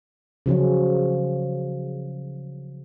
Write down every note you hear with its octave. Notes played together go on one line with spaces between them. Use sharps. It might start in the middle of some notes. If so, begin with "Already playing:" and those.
C#3 F3 F#3 C#4